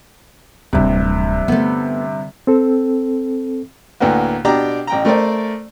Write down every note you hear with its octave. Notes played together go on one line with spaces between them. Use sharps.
D1 G2 C3 E3
D3 A3 B3
C4 A4
D2 A2 A#3 B3
B2 D4 G4 G5 A#5 D6
A1 G5 A#5
A3 A#4 C5 D5